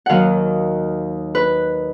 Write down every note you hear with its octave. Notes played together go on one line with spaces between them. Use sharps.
D#2 D#3 F#3 F5 F#5
B4